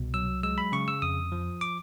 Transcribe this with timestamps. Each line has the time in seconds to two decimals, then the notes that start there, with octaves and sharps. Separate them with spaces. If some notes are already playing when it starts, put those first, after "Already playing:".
Already playing: C2 B2
0.14 F#3 E6
0.43 G#3 E6
0.58 B5
0.72 C#3 C#6
0.88 E6
1.02 F2 D#6
1.32 F3
1.61 D6